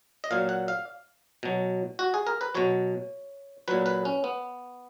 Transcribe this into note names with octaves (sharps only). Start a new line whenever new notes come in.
D#5
A#2 F#3 F5
F#5
F5
B2 F#3
F#4
G#4
A#4
B4
B2 F#3 C#5
A#2 F#3 B4
B4
C#4
B3